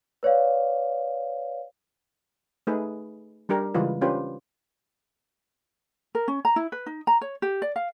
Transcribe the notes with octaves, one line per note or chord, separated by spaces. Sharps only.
B4 C#5 D5 F5
A3 D#4 G#4 B4
G3 D4 G4 A#4
C#3 E3 G3 G#3 F4 B4
C#4 D4 F4 G4 B4 C5
A#4
C#4
A#5
E4
B4
D#4
A#5
C#5
G4
D5
F5